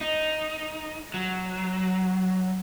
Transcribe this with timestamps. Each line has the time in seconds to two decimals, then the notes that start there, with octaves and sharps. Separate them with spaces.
0.01 D#4
1.14 F#3